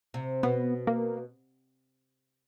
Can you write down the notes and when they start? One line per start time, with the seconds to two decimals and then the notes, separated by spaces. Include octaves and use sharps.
0.14 C3
0.43 B2 B3
0.87 A#3